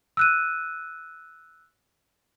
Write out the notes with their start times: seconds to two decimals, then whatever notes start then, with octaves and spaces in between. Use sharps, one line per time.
0.17 E6 F#6 D#7